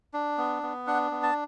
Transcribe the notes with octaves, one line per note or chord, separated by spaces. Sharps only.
D4
B3
B3
D4 F#5
B3
A5